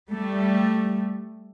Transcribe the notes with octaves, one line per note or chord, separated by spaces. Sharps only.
G3 A3